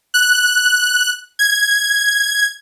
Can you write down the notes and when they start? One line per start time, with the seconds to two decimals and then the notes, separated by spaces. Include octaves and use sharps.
0.14 F#6
1.39 G#6